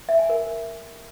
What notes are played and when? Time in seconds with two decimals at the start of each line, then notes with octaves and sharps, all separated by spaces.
0.09 E5
0.19 G#5
0.29 A#4